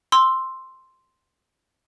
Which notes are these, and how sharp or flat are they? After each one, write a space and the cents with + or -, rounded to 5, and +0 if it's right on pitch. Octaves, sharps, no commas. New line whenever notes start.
C6 +0 E6 +0